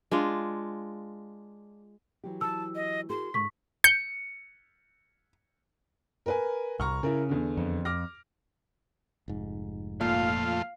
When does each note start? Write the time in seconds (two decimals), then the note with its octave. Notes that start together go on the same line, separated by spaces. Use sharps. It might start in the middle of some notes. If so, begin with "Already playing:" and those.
0.11 G#3 D4 F4
2.24 E3 F#3 G4
2.41 A5 E6
2.75 D#5
3.10 F#4 G#4 A#4 C6
3.34 G#2 D3 C#6 B6
3.84 G6 C#7
6.26 A#4 B4 G#5
6.80 C2 A#5 C#6 F6
7.03 C#3 E4 A#4
7.29 E2 D3
7.57 F2
7.85 D6 F6 A#6
9.28 F1 G#2
10.01 F2 A#2 A3 F4 F5